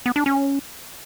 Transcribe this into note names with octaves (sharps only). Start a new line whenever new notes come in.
B3
D4
C#4